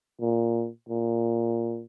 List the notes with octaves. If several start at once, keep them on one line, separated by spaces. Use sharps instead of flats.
A#2
A#2